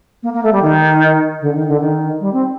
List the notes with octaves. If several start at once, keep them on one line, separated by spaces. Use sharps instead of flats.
A#3
A#3
A3
G3
D#3
D3
D#3
D3
D#3
G3
C4